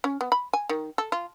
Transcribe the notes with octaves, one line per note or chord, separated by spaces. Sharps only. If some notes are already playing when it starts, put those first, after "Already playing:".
C#4
B3
B5
G#5
D#3
A4
F4